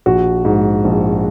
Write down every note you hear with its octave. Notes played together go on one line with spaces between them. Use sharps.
A#1 F#4
G#2
A#1